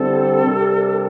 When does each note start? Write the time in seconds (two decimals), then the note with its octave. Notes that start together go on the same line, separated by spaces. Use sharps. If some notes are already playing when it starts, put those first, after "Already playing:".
Already playing: D3 G3 C4 E4 A4
0.44 C3 G3 D4 G4 A#4